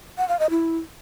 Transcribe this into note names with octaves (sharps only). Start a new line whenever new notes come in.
F#5
F5
D#5
E4